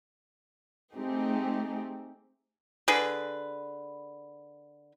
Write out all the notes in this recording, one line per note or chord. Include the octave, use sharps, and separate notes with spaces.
A3 C4 D#4 G4 G#4
D3 G#4 B4